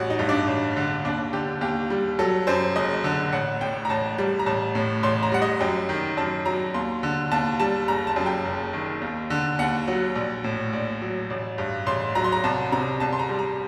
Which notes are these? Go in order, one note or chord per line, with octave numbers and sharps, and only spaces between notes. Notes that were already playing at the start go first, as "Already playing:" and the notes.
Already playing: A1 G3 F#4
D#4
G2
D4
A1
D3
D#2 D4
D3 G4
D#2 G4
G3
F#3 A4
F#2 C5
F#1 D#5
D3
A1 F#5
A2 G5
A#5
A1 A5
G3
A#5
A1 A5
A2
A1 C6
A#5
G3 F#5
D#5
F#2 G5
D#3
F#2 A5
F#3 A#5
D#2 C6
D3
D#2 A5
G3 A5
F#1 A#5
A5
F#2
G5
F#1
D#3
D#2
D3
D#2 F#5
F#3
A#1
A2
A#1
F#3
A1
G2
A1 C6
F#3 A#5
C6
A#5
C2 A5
C3 A#5
C2 A5
C6
A#5
G3
A#5